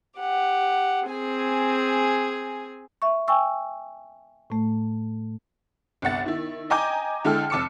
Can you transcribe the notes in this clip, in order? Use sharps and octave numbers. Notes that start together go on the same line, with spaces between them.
G4 F#5
C4 G#4 G#5
E5 C#6
G5 G#5 C#6 E6
A2 A3
G1 C2 F#5 A6
D#3 E4
D#5 G5 G#5 A#5 D6 G6
D3 G#3 E4 A4 G5 F6
F1 A5 D6 E6 C#7